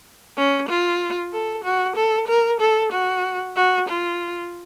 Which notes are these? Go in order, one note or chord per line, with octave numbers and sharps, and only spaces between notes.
C#4
F4
A4
F#4
A4
A#4
A4
F#4
F#4
F4